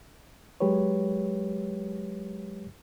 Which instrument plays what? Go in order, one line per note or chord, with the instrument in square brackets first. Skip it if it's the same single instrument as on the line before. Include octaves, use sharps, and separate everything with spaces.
[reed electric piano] F#3 G#3 G4 B4 C#5